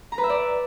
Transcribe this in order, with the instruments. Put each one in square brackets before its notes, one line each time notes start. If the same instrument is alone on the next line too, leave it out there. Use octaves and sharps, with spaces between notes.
[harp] A#5
B4
E5
D5